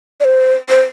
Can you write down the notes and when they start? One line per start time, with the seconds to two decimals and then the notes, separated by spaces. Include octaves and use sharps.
0.20 D5
0.25 C5
0.69 C5